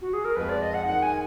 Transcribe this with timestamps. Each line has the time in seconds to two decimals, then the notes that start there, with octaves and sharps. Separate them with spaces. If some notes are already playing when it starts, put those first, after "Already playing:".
0.02 F#4
0.13 G#4
0.25 A#4
0.36 F2 F3 G#3 B4
0.49 D5
0.62 D#5
0.74 F#5
0.86 D#3 G#3 D#4 F#5
1.03 G#5